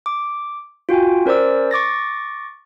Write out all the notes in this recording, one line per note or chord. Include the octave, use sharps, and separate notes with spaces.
D6
F4 F#4 G5 G#5
C#4 A#4 C5 D5 E6
C#6 D6 A6 A#6